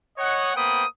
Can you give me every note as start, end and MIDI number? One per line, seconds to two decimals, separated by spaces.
0.18 0.52 73
0.18 0.52 75
0.18 0.52 78
0.55 0.85 58
0.55 0.85 59
0.55 0.85 72
0.55 0.85 79
0.55 0.85 83
0.55 0.85 87